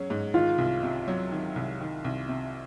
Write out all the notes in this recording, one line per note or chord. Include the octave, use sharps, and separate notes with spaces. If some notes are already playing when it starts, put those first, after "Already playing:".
Already playing: F#3 C#4 G#4
G#2
D#3 F4
C2
C3
F#3
D#3
C2
D#3
C2
C3